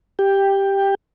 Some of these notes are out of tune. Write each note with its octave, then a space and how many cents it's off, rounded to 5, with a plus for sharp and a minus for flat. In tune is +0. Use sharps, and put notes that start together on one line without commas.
G4 +0 G5 +10